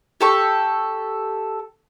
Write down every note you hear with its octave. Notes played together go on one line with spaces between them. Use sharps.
G4 A4 C#6